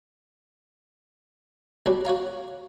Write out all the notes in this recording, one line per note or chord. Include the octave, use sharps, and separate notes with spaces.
B1 F#3 G3 D4
F#4 C#5 F5 A#5